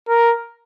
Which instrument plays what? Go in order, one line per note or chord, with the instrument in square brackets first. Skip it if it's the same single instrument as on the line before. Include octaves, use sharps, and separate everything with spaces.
[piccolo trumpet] A#4